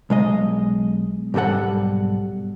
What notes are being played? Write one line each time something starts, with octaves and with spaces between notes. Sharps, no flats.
B1 G#3 D#5
B1 G#2 G3 A4 F#5